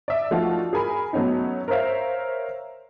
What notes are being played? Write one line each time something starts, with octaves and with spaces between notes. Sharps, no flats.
D5 E5
F3 A3 D4 D#4 F4 F#4
G#4 A#4 G#5 B5
F#3 A3 B3 C#4 D#4
A#4 C5 C#5 E5 F5